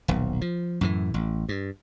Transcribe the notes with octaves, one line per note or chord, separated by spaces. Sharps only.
D#1 B1
F3
F#2 A2 E3
A1
G2